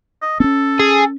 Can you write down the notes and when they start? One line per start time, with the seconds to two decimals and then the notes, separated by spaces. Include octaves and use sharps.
0.22 D#5
0.40 C4 C#4 A4
0.80 G#4